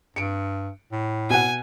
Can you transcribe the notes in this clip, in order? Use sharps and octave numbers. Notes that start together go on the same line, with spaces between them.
G2 C#7 D7
A2
B2 F#5 G#5